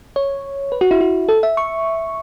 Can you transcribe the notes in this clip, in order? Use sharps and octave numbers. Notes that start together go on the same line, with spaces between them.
C#5
B4
F#4
E4
F#4
A4
E5
C#6